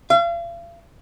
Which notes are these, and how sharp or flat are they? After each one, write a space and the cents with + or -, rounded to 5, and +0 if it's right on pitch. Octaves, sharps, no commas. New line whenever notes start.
F5 -40